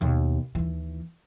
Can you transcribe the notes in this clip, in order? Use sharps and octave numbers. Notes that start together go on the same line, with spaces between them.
D#2 B2
D#2 E3